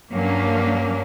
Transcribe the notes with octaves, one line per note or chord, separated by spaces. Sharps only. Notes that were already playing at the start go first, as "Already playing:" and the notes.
G2 F#3 A#3 C#4 D4